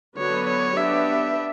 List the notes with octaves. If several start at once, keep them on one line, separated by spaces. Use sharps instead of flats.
D3 F#3 B3 F#4 B4 C#5
C#5
B3 D4 G4 E5